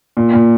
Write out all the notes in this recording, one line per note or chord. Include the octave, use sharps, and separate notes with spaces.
A#2
A#2